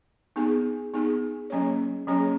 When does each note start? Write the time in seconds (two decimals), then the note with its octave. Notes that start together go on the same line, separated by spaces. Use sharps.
0.36 B3 D#4 G#4
0.94 B3 D#4 G#4
1.50 F#3 A#3 C#4 G#4 C#5
2.07 F#3 A#3 C#4 G#4 C#5